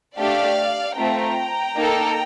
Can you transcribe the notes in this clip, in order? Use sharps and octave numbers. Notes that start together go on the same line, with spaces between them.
A3 D4 G4 D5 F5
A3 C4 F4 G5 A#5
A#3 D#4 A4